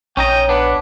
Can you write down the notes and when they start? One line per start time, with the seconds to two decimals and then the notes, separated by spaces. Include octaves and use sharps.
0.17 A#1 C#4 D#4 C#5 D#5 G5
0.49 B3 D4